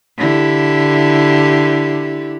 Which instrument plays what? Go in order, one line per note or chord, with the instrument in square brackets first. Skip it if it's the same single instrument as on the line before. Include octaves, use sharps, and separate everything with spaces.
[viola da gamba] D3 E4 G4